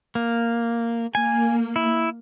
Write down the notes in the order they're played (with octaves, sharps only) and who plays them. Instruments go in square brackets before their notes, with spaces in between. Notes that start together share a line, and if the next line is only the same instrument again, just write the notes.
[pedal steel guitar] A#3
[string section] A#3 [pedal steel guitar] G#5
[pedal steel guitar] E4